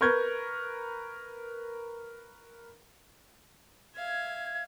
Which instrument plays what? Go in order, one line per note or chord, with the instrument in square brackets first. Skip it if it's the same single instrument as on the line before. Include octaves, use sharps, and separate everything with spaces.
[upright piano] A#4 B4 C#6 G6 G#6
[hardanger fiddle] E5 F5 [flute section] G#6